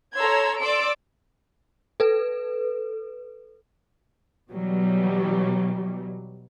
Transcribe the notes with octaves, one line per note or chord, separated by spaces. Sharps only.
A4 C#5 A#5 C6 E6 G#6
D5 C6 D6 E6 D7
A4 B4
B2 E3 F#3 G3